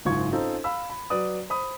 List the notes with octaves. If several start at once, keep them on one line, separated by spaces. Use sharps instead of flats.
F#1 G#2 F4 C#6 G#6
C4 C#4 D#4 F4 A4
F5 B5 E6
B5
F#3 B4 D5 D#6
C5 B5 D#6